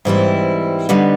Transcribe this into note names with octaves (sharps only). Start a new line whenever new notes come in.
G#2 E3 G3 C4 E4
D3 G3 B3 D#4